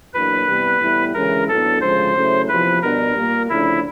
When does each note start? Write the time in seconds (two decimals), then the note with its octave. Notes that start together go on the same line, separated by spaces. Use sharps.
0.13 E2 B2 F#3 A#3 D4 B4
0.47 C3 E3 G3 B3
0.80 A2 E3 G3 B3 E4
1.14 D2 C#3 E3 G#3 C#4 A#4
1.48 A2 F#3 B3 D4 A4
1.81 D2 C#3 F3 G#3 C5
2.15 C#3 F#3 A3 C#4 E4
2.48 E2 C3 F3 B4
2.82 B2 G3 B3 D4 A#4
3.15 A#2 G3 A#3
3.49 D2 C#3 F3 A3 D4 E4